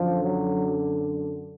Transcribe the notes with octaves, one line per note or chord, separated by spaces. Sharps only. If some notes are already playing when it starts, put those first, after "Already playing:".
Already playing: F#2 D3 F3
F#3